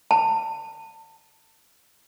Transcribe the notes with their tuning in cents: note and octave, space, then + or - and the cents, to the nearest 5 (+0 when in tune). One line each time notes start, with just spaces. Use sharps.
A5 +30